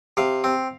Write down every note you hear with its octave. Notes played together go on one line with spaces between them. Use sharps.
C3 F5
C4